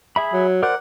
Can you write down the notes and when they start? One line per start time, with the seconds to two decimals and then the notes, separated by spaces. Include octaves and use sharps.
0.16 G#4 E5 B5
0.33 F#3
0.63 A#4 C5 D5 F#5